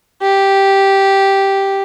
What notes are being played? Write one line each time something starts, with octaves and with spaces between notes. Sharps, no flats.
G4